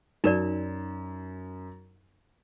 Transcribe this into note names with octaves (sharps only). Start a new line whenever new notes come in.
F#2 D#4 A#4 D5 E7